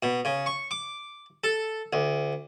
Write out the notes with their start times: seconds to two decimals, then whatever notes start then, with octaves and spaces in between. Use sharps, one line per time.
0.03 B2
0.25 C#3
0.46 C#6
0.71 D6
1.44 A4
1.93 D2